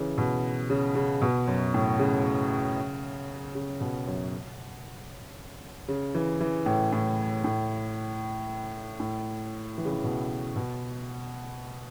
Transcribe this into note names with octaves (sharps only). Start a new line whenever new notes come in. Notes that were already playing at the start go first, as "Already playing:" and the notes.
Already playing: C#3 E3
B2
C#3
C#3
B2
F#2
A2
C#3
C#3
B2
F#2
C#3
E3
E3
A2
A2
A2
A2
E3
C#3
E3
B2
B2